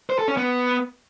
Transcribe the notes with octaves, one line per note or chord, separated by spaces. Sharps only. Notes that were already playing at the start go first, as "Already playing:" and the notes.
C5
A4
C#4
B3